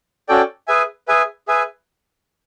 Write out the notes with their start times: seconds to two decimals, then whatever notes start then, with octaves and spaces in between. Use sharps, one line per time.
0.29 C#4 F#4 A4 D5 G5
0.68 G#4 B4 E5 G#5
1.08 G#4 B4 E5 G#5
1.48 G#4 B4 E5 G#5